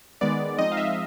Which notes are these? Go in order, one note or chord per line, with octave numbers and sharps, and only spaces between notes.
D#3 G#3 B3 D5
F3 G#3 C4 D#4 D#5
F5
E5